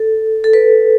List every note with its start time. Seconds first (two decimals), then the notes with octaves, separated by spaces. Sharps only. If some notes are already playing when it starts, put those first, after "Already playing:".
Already playing: A4
0.44 A4
0.53 B4